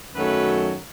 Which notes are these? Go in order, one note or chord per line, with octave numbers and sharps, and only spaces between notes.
F#2 D#3 F#3 A3 B4